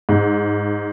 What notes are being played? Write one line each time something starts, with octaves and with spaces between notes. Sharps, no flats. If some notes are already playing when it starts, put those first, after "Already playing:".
G#2